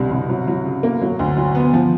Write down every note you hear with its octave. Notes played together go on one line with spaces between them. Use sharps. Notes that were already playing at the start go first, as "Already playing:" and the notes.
Already playing: C2 B2 D3 G3
C2
F#3
F#3
C#3
A#3
F#3
D2
F#3
B3
F3